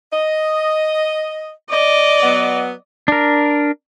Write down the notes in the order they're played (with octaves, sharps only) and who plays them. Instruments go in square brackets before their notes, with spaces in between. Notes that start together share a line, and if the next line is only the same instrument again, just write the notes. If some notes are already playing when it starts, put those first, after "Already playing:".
[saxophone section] D#5
[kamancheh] D5 D#5
[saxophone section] F#3 B3
[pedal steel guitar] D4 A#4